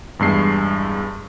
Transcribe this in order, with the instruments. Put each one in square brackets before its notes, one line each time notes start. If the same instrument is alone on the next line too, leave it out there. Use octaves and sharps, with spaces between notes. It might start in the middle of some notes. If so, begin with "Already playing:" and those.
[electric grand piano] E2 G2 G#3 C7